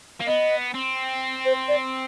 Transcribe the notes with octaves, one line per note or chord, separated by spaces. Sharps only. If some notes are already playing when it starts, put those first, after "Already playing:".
A#3
B3 D#5
C4
C5
D5